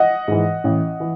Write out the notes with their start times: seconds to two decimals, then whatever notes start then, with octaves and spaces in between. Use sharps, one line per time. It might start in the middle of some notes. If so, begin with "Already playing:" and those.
Already playing: D#5 F#5
0.28 G#2 E3
0.64 A1
1.00 E3